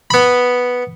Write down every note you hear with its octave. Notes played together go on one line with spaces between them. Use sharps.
B3 B5